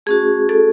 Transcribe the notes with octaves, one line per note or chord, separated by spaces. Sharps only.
A3 C#4 F#4 G#4
A4